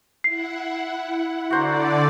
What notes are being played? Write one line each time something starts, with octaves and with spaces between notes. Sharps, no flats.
E4 F#5 C7
D3 F#4 C5 D5 A#5